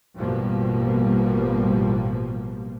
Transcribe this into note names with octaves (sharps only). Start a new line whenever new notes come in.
A1 G2 B2 F3 G3 A#3